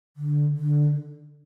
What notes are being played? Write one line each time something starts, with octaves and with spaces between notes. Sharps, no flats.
D3
D3